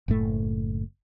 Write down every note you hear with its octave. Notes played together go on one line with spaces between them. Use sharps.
F#1 A2 A3